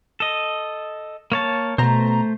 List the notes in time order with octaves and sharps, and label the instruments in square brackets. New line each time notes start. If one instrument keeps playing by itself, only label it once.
[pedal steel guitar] A4 D#5
A#3 C#5 A5
[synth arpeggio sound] B2 A#5 [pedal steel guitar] A3 C5